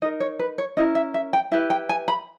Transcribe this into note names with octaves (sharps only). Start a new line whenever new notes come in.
D#4 A#4 D#5
C#5
B4
C#5
C#4 E4 A#4 D#5
E5
E5
G5
E4 G4 B4 E5
G5
G#5
B5